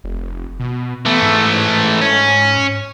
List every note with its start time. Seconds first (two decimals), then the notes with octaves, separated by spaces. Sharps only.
0.04 F1
0.60 B2
1.05 E3 A3 B3
1.22 G#2
2.01 C#4